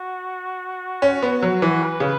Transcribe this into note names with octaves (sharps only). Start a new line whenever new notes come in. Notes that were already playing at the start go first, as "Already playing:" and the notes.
Already playing: F#4
C#4
B3
F#3
E3
B4
C#3